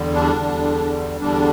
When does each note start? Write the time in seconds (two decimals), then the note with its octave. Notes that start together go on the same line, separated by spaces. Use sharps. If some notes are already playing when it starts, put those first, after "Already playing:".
Already playing: E2 D3 G3
0.14 D4
0.36 E2 D3 G3
1.21 E2 D3 G3 D4